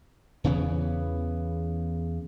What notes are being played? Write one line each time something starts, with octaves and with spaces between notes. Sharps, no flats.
E2 C#3 E3 B3